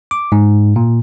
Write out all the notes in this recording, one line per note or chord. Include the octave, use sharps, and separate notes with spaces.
D6
G#2
A#2